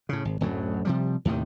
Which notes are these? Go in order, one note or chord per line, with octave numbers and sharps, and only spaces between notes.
A2 C#3
G#1
D1 F#2 A2 F#3
C3 F3 G3
D#2 A2 C3 D#3